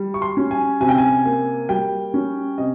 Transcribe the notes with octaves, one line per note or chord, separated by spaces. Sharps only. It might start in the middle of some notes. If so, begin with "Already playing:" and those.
Already playing: G3
C#6
C6
C#4
G#5
C3 G#5
G5
G#5
A#3
G3 G5
C#4
C3 D#5